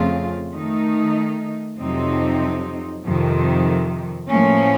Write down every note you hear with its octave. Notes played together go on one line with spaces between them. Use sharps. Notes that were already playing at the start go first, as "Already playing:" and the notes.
Already playing: F2 C#3 A3 C4 F4
D#3 A3 D#4
F2 C3 F#3 C4 D#4
F2 C3 D#3
A2 F3 A#3 C#4